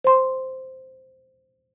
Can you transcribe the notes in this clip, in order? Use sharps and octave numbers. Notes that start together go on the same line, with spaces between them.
C5 C6